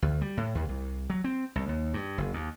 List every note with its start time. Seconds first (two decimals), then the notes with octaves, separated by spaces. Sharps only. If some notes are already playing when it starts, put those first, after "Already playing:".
0.02 D2
0.21 G3
0.37 A2
0.55 D#2
0.69 C2
1.10 F#3
1.24 C4
1.56 C2
1.69 D#2
1.94 G2
2.18 F#1
2.33 D#2